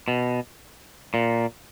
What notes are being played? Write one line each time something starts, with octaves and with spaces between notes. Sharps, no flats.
B2
A#2